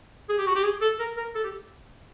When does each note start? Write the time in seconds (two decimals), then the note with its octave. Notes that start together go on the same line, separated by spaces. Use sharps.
0.29 G#4
0.38 G4
0.47 F#4
0.55 G4
0.64 G#4
0.82 A4
0.99 A#4
1.17 A#4
1.35 A4
1.44 G4